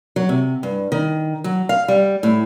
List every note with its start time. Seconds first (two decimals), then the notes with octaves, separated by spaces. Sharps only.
0.16 F#3
0.29 C3
0.63 G2
0.92 D#3
1.44 F#3
1.69 F5
1.88 G3
2.23 A2